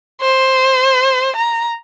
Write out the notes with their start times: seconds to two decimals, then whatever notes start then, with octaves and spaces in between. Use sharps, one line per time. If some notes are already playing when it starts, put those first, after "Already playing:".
0.22 C5
1.36 A#5